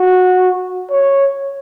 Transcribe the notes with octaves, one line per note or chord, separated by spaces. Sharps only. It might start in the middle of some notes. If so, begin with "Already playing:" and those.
Already playing: F#4
C#5